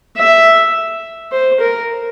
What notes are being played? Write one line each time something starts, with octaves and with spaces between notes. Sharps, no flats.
E5
C5
A#4